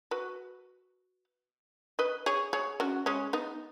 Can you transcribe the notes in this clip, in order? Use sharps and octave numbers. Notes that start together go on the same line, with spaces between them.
F#4 B4
B4 D#5
G#4 C#5
G#4 C#5
C#4 F#4
G#3 C#4
B3 D#4